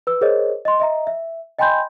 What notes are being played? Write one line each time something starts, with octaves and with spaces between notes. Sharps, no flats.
B4 E6
G#4 A#4 C5 C#5 D#5
D#5 C6
D#5 E5 A#5
E5
D#5 G5 G#5 B5 C6 G6